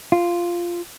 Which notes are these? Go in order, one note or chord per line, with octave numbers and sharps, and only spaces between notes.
F4